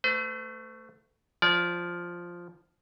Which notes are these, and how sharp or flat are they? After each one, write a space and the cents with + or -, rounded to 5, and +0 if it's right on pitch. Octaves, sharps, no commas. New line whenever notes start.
A3 +15 C5 -45
F3 +0 D5 -25